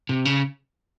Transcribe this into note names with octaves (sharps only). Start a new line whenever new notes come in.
C3
C#3